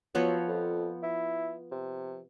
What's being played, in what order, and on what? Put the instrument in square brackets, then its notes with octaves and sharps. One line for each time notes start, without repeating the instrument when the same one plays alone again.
[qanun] F3 B3 C#5 [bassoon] F#3
[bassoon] F2
E4
C3